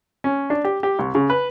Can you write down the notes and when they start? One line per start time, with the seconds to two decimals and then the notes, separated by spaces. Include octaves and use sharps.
0.24 C#4
0.50 D4
0.65 G4
0.83 G4
0.99 C2
1.15 C#3
1.30 B4